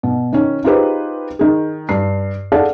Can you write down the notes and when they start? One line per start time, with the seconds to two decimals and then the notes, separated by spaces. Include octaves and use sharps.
0.03 B2
0.33 D#3 C#4
0.64 D#4 F4 G4 G#4 B4 C5
1.39 D#3 G#4
1.89 G2 C7
2.52 G#4 A4 D5 F5 F#5 A5